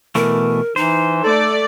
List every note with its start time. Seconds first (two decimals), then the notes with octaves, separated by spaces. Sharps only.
0.15 B2 E3 A3 A#4
0.76 E3 D#4 C5
1.23 A3 A4 D5